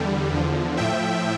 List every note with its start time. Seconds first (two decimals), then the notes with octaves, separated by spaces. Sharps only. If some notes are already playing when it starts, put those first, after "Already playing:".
Already playing: E2 D3 G3
0.33 E2 D3 F3
0.77 A2 F3 E5 G5